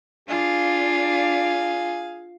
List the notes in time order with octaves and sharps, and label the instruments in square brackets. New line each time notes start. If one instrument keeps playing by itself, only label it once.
[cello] D4 [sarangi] F4 [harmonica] G#4 F5